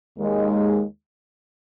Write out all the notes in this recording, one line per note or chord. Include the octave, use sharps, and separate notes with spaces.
D#2 D#3 G#3